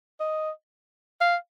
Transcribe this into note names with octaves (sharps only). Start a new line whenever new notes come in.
D#5
F5